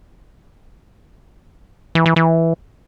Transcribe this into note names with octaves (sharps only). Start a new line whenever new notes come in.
E3
E3
E3